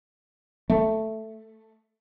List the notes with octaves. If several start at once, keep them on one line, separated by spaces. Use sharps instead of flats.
A3